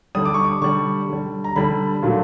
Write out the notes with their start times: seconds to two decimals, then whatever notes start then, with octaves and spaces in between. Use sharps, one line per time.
0.15 D3 G3 D#6
0.25 D6
0.34 C#6
0.44 D6
0.62 D3 G3 C#6
1.09 D3 G3
1.44 A#5
1.56 D3 G3 B5
2.02 A#2 F#3 A3